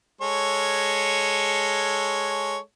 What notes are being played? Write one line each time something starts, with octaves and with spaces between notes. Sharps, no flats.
G#3 A4 C#5